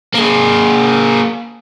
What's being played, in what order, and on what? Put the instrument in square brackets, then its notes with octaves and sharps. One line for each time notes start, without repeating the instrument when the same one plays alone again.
[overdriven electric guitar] A#3 G#4